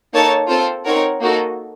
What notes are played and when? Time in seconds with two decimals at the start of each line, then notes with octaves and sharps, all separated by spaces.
0.13 A#3 D#4 A4 C#5 A5
0.49 C4 F4 A4 C5
0.85 C4 D#4 A#4 C#5 F#5
1.21 A#3 D#4 F#4 A4